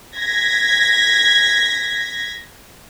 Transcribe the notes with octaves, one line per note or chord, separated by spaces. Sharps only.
G#6 A#6 B6